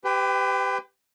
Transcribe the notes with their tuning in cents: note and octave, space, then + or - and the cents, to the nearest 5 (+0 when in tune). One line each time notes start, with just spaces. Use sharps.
G4 +0 B4 +35 G5 +35